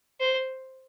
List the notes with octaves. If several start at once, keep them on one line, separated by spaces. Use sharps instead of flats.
C5